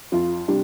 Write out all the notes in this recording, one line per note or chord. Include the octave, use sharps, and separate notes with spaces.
F2 F4
C3 G3 D4